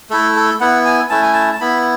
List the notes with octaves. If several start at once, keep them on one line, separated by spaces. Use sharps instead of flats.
A3 E4 A4
A4
B3 E4 F#5
G#5
A3 C#4 E4 A5
G#5
A5
A5
B3 E4 B5